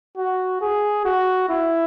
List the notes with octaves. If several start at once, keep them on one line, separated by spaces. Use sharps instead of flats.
F#4
G#4
F#4
E4